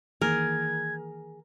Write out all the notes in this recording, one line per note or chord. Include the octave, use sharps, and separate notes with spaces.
D#3 E3 A#3 G#4 A#4 G#6